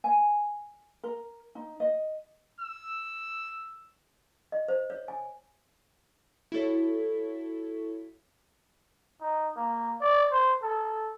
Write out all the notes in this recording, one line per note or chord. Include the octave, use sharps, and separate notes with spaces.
G#5
A#4
D#4
D#5
E6
D#5
C5
C#5
G#5
E4 F#4 A4 C#5
D#4
A#3
D5
C5
A4